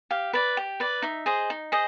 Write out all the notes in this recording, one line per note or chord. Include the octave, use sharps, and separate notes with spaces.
G4 F5
B4 D5
G4
B4 D5
D#4 E5
G#4 C5 D#5
D#4
G#4 C5 D#5